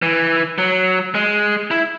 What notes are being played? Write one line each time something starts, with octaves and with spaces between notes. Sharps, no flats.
E3
F#3
G#3
E4